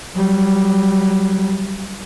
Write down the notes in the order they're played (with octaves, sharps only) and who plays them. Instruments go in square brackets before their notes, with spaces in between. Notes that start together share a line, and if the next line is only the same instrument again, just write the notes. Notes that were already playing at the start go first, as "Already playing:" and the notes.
[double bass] F#3 G3